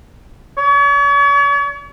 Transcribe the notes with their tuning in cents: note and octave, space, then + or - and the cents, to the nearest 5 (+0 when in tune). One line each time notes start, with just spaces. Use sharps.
C#5 +40